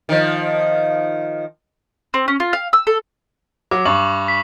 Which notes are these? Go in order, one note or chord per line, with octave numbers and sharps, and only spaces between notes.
D#3 F3
C4
C#4
F4
F5
E6
A4
F#3 D6
G2 C#6 F#7
B6